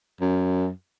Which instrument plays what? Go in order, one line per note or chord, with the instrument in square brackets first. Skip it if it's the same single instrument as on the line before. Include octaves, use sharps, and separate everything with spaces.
[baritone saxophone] F#2